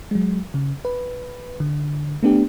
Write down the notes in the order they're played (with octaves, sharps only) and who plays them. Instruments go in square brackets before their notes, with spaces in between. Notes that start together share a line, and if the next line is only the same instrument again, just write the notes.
[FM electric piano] F#3 G#3
C#3
B4
D3
A3 B3 D4 G4